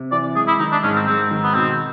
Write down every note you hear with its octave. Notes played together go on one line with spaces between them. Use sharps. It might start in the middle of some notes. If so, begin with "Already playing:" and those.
Already playing: C3
E3 D5
G#3 G#4
E4
D#3 D#4
D4
G#2 C#4
C4
G#2 C4
D#3
B3
B2 C4